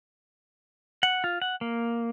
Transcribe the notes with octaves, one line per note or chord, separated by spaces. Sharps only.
F#5
F4
F#5
A#3